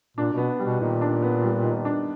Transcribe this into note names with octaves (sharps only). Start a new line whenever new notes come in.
A#2 D4
B2
B3
G3
B2
A#2 D#3
D4
B3
G3
D#3
D4